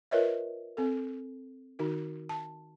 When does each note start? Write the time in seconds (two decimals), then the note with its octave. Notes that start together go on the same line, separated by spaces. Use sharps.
0.11 F4 A#4 B4 C#5 D#5 E5
0.77 C4 A4
1.79 D#3 D#4 F#4
2.29 A5